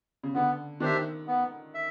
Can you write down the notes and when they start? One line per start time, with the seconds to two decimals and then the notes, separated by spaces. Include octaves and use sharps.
0.23 C#3
0.34 D3 B3
0.80 D#3 D4 G4 C5 E5
1.27 B3
1.74 E5